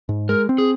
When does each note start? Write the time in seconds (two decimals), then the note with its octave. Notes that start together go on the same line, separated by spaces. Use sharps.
0.09 G#2
0.29 G#3 A#4
0.49 C4
0.58 G#4